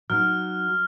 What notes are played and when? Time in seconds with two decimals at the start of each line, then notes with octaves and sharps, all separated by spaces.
0.10 F#3 D#4 F6